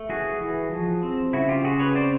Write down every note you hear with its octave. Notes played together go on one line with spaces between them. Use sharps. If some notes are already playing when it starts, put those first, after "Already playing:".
Already playing: A3
E3 F#4 G#4
E3
F3
C4
C#3 E4 F#4
F4 G4
C#3 F#4 G#4
B4 C#5
C4 C5 D5